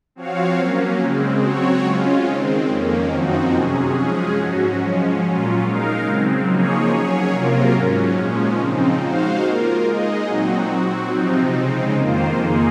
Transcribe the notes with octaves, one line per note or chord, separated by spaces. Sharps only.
F3 C4 F#4 C#5 F5
F#3 A#3 C#4
C#3 G#3 C4
F#3 C4 F#4 C#5
C#3 G#3 C#4 F4
D#3 G#3 C4
F2 D#3 A#3 C#4
F#2 F3 C4 D#4 F#4
C3 F#3 C#4 G#4
F3 G#3 C#4 G#4
G#2 F#3 C#4 F#4
F3 G#3 C#4
A#2 F#3 C#4 F4
G#3 D#4 A#4 F5
C#3 F#3 C4
F3 A#3 D#4 G#4 C#5
F#3 C#4 G#4 C#5
C3 F#3 A#3 F4 A#4
G#2 F#3 C#4
A#2 F3 G#3 C#4
C#3 F3 C4 D#4
G#3 D#4 F#4 C5 F5
A#3 F4 A#4
G#3 D#4 G#4 D#5
A#2 F#3 C4 D#4 F#4
F#3 C4 F#4
C3 F3 C4 D#4
C#3 G#3 C4 D#4
F2 D#3 A#3 F4 C5
A#3 D#4 G#4